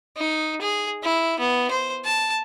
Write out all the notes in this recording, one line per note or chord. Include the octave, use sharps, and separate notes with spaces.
D#4
G#4
E4
B3
C5
A5